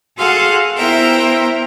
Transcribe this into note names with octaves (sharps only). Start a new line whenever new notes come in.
F#4 G#4 A4 F5 F#5 C6
B3 E4 A#4 C5 E5 G5